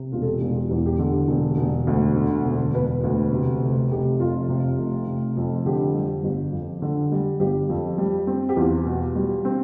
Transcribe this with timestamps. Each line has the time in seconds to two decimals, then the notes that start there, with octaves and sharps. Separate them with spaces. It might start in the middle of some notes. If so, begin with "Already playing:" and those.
Already playing: C3
0.12 E1 F4
0.22 A4
0.26 G4
0.41 E1 F4
0.55 G4
0.71 E2
0.86 G4
0.99 D3 G4
1.28 E1
1.57 E1
1.87 D2
2.16 D3
2.45 E1
2.74 E1 B4
3.04 D2
3.32 C3
3.62 F1
3.91 F1 G4
4.20 F2 F4
4.49 C3
4.78 F1
5.07 F1
5.37 F2
5.66 D3 G4
5.94 G3
6.24 G1
6.52 F2
6.82 D3
7.12 G3
7.40 G1 G4
7.70 F2
7.98 G3
8.27 C4
8.49 G4
8.57 E2 F4
8.86 B2
9.15 G3
9.45 C4